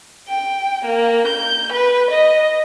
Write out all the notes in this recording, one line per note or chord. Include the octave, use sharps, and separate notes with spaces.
G5
A#3
G6
B4
D#5